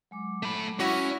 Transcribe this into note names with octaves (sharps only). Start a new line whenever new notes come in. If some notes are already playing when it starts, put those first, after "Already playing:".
F#3 G#3 D6
A3 B5
C#4 E4 F#4